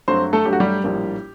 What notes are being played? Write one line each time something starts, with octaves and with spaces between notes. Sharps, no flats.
G2 F#3 A3 C4 C5
A3 A4
G2 F#3 A3 G4
F#4
G3 G4
A#1 A2 G3 A#3